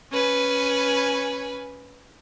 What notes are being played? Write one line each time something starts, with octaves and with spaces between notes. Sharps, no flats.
C#4 B4 G#5